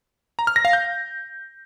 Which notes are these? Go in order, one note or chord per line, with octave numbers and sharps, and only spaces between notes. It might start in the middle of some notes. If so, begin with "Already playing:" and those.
A#5
F6
A#6
F5
G6